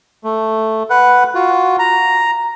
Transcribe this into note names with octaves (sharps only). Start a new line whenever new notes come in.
A3
B4 F#5
F4 F#4
A#5